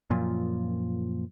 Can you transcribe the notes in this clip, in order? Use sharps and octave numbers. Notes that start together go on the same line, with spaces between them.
F#2 A#2 F3